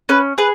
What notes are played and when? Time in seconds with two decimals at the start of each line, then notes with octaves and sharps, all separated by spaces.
0.09 C#4 B4
0.38 G#4 B4